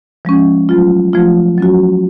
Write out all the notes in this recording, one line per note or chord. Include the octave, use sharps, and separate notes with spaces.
F3 G#3 C#4
F#3 A3 F4
F3 A3 F4
F#3 C#4 F#4